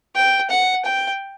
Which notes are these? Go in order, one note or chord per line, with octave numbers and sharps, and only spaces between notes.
G5
F#5
G5